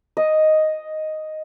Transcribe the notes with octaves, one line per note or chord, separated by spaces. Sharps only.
D#5